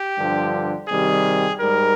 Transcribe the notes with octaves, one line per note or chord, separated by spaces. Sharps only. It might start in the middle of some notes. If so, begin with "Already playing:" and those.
Already playing: G4
G2 D3 F3
C3 D#3 G3 G#4
G#2 G3 A#4